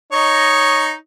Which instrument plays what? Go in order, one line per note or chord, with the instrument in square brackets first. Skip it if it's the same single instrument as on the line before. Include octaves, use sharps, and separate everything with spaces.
[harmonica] D#4 C#5 D#5